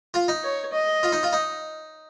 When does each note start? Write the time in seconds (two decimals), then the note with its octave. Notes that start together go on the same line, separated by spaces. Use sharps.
0.14 F4
0.28 D#4
0.44 C#5
0.73 D#5
1.03 F4
1.12 D#4
1.23 F4
1.33 D#4